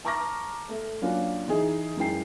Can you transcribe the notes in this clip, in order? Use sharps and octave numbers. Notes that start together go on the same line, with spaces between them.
A5 A#5 C#6 D6 F6 A#6
A3
F#3 A#3 C#4 D4 F4 F#4
E3 D#4 G#4
F#2 G#3 E4 G5 C7